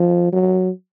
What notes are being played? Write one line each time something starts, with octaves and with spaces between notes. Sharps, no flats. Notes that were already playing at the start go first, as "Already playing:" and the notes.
Already playing: F3
F#3